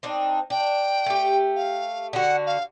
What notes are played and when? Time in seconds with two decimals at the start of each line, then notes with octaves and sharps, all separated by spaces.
0.03 C4 D4 D#4
0.50 D4 G5
1.06 A3 G4
1.55 F5
2.13 D3 F#4 F#5
2.46 F5